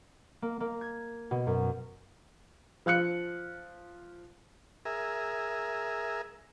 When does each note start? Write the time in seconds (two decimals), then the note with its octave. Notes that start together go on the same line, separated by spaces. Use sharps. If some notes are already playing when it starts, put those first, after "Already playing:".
0.42 A#3
0.60 A#3
0.81 G#6
1.31 B2
1.47 F#2
2.86 F3 F5 F#6 C#7
4.85 G#4 A#4 E5